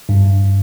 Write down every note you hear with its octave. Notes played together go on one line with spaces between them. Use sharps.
G2